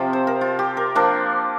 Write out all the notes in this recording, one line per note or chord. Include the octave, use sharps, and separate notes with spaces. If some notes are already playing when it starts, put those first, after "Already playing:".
Already playing: C3 F3 C4 F4
C5
A#4
F4
G4
A#4
F3 A#3 D4